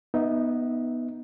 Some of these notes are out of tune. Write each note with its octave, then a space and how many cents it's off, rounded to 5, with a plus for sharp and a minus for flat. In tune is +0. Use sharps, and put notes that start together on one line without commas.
B3 -5 D#4 +0 E5 -25